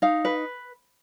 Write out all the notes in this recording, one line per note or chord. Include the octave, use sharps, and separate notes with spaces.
D#4 F5
B4